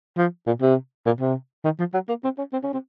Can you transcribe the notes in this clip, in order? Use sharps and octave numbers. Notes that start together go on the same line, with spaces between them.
F3
A#2
C3
A#2
C3
D#3
F3
F#3
A#3
C4
C#4
C4
C#4
C4